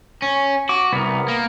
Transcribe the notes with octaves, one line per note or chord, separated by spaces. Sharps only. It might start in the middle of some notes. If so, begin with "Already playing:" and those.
C#4
F#4 D6
C2 B3 A#4
A#3